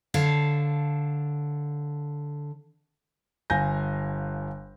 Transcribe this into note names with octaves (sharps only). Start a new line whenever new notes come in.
D3 C#5 F5 A5
G1 F5 G#5 G6 A#6